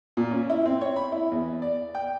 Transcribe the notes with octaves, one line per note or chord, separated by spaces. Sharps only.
A#2
C#4
E4
C4
C#5
B5
E4
E2
D5
G5